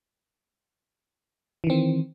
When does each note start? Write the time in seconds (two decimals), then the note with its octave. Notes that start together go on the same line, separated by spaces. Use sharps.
1.64 E3
1.67 D#3
1.70 C4